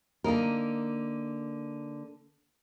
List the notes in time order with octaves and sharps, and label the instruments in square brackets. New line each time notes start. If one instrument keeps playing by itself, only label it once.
[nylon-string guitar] D3 A#3 D#4 A#4